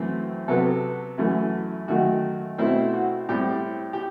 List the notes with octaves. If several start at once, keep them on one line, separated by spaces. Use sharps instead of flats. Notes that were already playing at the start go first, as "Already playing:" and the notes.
Already playing: F#2 E3 A3 C4
C3 F#3 B3 A4
F#2 E3 A3
F#2 D#3 A3 F#4
B2 A3 C4 E4
F#4
A2 G3 C4 G4
G4